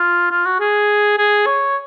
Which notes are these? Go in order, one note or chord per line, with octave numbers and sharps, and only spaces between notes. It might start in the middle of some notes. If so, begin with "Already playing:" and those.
Already playing: F4
F4
F#4
G#4
G#4
C#5